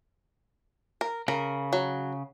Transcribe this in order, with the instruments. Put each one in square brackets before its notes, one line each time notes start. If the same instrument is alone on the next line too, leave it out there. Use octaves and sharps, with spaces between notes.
[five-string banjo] A#4
[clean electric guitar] C#3 [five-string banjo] A#4
[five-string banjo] F#3